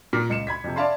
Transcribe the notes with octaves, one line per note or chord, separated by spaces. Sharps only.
A#2
C#2 C#7 E7
B5 G#6 B6
F2 C3
D5 E5 F5 A5 B5 C6